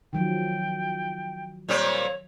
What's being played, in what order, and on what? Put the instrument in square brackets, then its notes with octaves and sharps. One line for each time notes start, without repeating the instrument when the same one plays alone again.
[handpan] D#3 F3 F#3 [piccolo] G5
[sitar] A#2 G3 C4 [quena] C#5 [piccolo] F7